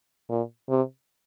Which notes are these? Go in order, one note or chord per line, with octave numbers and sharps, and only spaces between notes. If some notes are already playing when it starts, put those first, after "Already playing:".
A#2
C3